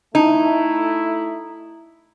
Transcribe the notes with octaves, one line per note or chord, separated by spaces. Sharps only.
A3 D#4 E4